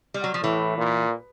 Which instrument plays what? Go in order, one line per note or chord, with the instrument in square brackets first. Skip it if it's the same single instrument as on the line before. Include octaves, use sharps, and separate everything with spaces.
[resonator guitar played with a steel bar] G3
F#3
F3
[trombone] A2 [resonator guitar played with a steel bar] E3
[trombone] A#2